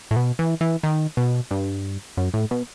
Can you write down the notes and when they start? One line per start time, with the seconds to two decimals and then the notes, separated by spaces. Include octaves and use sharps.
0.11 A2
0.16 B2
0.39 E3
0.61 E3
0.83 D#3
1.17 B2
1.51 G2
2.17 F#2
2.34 A2
2.51 B2